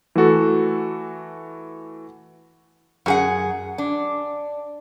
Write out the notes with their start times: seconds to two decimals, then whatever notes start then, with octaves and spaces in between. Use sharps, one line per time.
0.16 E3 A3 F#4 A4
3.06 F#2 G#4 F#5
3.78 D4